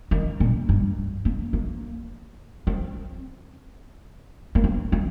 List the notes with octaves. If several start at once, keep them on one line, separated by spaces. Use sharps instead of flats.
D#3
A#2
G2
A#3
A#3
C4
A#3
C4
C4